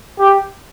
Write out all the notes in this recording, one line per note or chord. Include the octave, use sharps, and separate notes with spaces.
G4